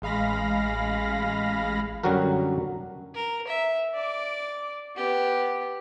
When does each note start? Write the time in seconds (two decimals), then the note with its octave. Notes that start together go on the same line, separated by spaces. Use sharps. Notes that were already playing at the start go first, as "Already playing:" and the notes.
0.02 A1 G#3 F5 B5 A#6
2.03 F#2 D3 F#3 G3 F#4 A#4
3.15 A#4
3.48 E5
3.94 D5 D6
4.96 B3 G4